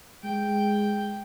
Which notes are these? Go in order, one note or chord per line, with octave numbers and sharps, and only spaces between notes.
G#3 G5